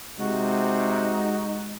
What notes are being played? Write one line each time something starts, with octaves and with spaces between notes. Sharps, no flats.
C3 G#3 D#4 F#4